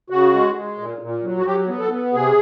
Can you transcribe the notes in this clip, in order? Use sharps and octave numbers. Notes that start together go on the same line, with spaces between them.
C#3 F#4
G#3
G#3
A#2
A#2
F#3
F#4
F#3 G4
B3
A4
B3
C3 G#4